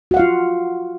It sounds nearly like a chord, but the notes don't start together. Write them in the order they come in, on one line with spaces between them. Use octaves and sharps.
F#4 F#5 F5 F4